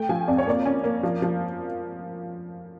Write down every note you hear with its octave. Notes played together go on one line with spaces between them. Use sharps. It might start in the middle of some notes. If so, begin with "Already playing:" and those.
Already playing: A3 G5
F3 G#5
F2 D5
C#5
A#3 D5
C#4
A#3
F3
F3